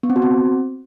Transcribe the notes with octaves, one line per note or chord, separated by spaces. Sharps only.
B3
C4
F#4
C4